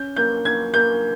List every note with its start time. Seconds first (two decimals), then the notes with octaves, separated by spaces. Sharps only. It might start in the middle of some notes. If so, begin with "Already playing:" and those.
Already playing: C#4 G6
0.16 A#3 G6
0.45 A#3 G#6
0.73 A#3 G6